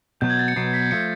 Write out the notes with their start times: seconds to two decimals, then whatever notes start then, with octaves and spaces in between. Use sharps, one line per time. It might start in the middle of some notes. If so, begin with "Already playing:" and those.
0.21 B2 F#3 B3 G6
0.30 G#6
0.39 A6
0.48 C#7
0.56 B2 F#3 B3 C7
0.74 B6
0.91 F3 A3 C#7